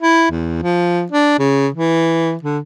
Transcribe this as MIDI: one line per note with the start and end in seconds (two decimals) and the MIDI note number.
0.01 0.29 64
0.31 0.59 40
0.62 1.04 53
1.12 1.36 62
1.39 1.68 49
1.74 2.35 52
2.43 2.59 50